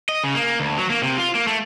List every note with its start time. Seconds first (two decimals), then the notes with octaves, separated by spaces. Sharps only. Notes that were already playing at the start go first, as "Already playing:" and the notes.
0.09 D#5
0.24 C#3
0.35 A#3
0.60 D2
0.78 F#3
0.90 A#3
1.02 C3
1.18 F4
1.35 A#3
1.47 A3